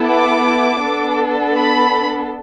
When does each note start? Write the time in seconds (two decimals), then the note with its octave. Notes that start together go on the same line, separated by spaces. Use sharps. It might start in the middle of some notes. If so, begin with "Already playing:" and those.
Already playing: B3 E4 A4
0.09 D6
0.82 B3 D4 A4
1.56 B5